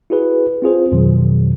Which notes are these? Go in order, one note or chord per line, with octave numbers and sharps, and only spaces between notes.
E4 F#4 G#4 B4
C4 F4 G#4 C5
F2 B2 D#3 F#3